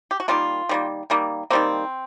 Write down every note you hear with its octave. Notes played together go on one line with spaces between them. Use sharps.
G4
F#4
D#3 G3 A#3 F4
D#3 G3 A#3
D#3 G3 A#3
D#3 G3 A#3 C4